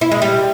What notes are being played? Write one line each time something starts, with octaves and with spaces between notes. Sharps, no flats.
E4
G#3
G3